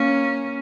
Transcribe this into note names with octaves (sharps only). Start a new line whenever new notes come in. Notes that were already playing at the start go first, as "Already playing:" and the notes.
Already playing: A#3 C#4